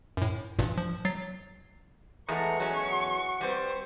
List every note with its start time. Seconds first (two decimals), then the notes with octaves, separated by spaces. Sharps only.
0.17 F#2 A2
0.59 A1 G2 A#2
0.77 F3
1.05 F#3 A6 C7
2.29 E2 G#3 A3 B4 F#5 A#5 C#6
2.60 E2 F#3 C#4 G#4
2.92 F#4
3.41 G3 C4 G4 B4 C5